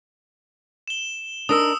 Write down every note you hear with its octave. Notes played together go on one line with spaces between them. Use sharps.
E7 G7
D4 D#4 A#4 D#6 E6